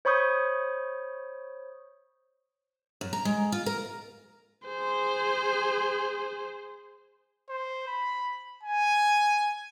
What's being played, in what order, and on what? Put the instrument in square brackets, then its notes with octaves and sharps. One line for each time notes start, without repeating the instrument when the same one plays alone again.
[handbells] C5 C#5 B5 C#6 D#6 G6
[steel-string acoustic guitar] F#2
A#5
G#3
F4
A#4
[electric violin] G#4 C5
[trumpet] C5
B5
G#5